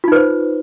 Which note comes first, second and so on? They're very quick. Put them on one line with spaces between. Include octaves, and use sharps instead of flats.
F4 D#4 B4 C5